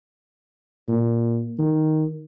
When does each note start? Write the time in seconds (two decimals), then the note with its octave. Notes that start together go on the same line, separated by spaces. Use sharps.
0.88 A#2
1.58 D#3